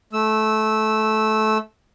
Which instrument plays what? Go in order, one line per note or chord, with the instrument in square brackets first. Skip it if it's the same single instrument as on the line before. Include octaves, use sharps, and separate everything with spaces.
[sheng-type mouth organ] A3 E6